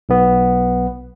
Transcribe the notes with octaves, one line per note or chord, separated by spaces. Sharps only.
B1 B3